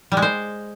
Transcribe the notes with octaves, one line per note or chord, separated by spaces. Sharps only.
G3
G#3
C5